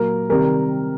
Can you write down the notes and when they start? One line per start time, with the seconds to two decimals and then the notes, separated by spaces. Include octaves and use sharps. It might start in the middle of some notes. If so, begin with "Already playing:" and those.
Already playing: A#2 F#3 A#3 A#4
0.29 C3 D#3 G3 A#4